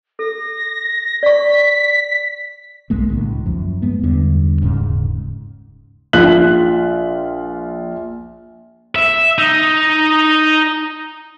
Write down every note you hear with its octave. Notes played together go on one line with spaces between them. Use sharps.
A4 A#6
D5 C#6 B6
B1 G2 G#3 A#3
C#2 A2 D#3
F#2 F3
G2 G#3 B3
E2 G2 D3
D#1 G#2 C#3 C#4
A#1 F4 F#6 B6 F#7
E5
D#4